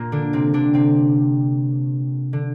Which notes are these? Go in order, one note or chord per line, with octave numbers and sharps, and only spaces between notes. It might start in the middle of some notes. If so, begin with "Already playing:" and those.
Already playing: A#2 A#3
D3 D4
C3 C4
D3 D4
C3 C4
D3